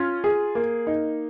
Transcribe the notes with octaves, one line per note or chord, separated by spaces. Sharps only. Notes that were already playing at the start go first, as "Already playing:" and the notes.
Already playing: C#4 F4
G#4
A#3
D#4